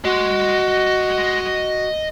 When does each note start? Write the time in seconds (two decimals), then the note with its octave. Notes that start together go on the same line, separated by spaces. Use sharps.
0.04 F#4 D#5 C6